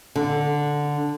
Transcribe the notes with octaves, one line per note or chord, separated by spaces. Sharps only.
D3